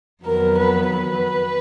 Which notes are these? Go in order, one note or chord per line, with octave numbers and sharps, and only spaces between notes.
F2 D#3 F#3 B3 A#4
B4
B4